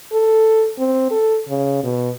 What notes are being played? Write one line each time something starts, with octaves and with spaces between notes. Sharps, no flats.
A4
C4
A4
C#3
B2